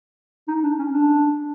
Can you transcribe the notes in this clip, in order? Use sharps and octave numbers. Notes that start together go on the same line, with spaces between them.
D#4
D4
C#4
D4